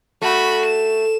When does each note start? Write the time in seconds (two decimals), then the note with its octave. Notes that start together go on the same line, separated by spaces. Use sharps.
0.22 A3 F#4 B5
0.65 E7